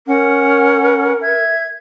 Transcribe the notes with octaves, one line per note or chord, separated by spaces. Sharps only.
C#4 A#4 F#5
E5 G#6